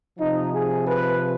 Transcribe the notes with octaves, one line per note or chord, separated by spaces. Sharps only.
C3 F3 D#4
G#4
B4